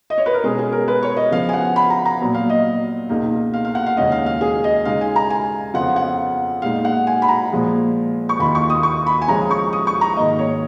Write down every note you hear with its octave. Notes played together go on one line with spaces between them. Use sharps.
D#5
C#5
B4
A#4
B2 G#3 C#4 G#4
G#4
A#4
B4
C#5
D#5
C#3 F3 B3 F5
G#5
F#5
B5
A#5
A#5
A#2 F#3 B3
F5
D#5
C#2 B2 A#3 D#4
F5
F5
F#5
F5
D#2 C#3 G#3 C#4 D#5
F5
F5
G#4
D#5
C#3 G#3 D#4 F5
G#5
A#5
G#5
F2 C#3 F3 B3 F4 F#5
F#5
A#2 G#3 D#4 F5
F#5
G#5
B5
A#5
A#2 F3 G#3
C#6
D#2 D#3 A#3 F4 B5
C#6
D#6
C#6
B5
G#5
C#3 F3 G#3 C#4 A#5
C#6
D#6
C#6
A#5
G#2 D#3 A#3 D#5
C#5